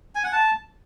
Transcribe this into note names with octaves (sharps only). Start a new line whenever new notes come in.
G#5
F#5
A5